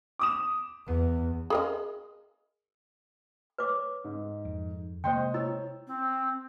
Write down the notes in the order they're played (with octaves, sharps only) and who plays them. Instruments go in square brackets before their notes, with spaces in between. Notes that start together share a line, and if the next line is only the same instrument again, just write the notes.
[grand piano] D6 D#6 E7
[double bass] E2 [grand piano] B3
[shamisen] G#4 A#4 D#5
[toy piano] B4 D6 [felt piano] C#5
[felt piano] G#2
[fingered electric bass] F2
[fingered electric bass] C3 G#3 A#3 [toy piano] C5 G5 [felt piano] D#5 C6 G6
[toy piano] E4 [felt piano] C#5 E6
[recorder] C4